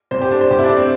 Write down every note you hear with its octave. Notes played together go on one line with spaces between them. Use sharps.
C3 C5
G4
A3 D4
C5
C3 G4
E4
D4
A3
C4